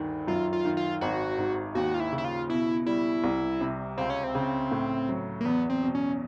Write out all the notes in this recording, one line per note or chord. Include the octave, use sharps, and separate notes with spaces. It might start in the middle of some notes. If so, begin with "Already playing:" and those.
Already playing: D2 G2 D#3
F#2 F4
F4
D#3
F4
G#1 F#4
G#2
D#2 F#4
F4
E4
C#3
E4
F4
B2 E4
G3 E4
C2
C3
C#2 C4
C#4
C4
C#3
A2
F#3
A#3
E2 B3
C4
B2
C#4